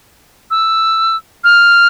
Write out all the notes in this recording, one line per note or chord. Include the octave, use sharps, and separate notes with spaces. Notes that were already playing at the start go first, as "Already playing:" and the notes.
E6
F6